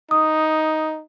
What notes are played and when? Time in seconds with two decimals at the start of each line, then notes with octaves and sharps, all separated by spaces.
0.11 D#4 D#6